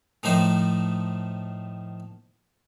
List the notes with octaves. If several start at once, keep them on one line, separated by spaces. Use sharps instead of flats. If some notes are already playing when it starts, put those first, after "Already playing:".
A2 D#3 F3 A3 D#4 C5